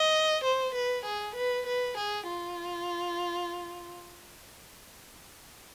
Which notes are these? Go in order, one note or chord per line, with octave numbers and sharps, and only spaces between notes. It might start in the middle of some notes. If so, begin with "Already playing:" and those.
Already playing: D#5
C5
B4
G#4
B4
B4
G#4
F4